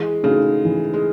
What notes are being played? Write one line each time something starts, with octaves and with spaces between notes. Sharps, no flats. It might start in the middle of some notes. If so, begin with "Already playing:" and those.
Already playing: E3 G#3
C#3 A3 D#4 F#4
E3
G#3